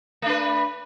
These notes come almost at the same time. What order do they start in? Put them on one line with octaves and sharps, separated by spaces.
A3 D4 B4